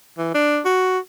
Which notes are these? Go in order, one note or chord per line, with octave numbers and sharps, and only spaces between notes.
E3
D4
F#4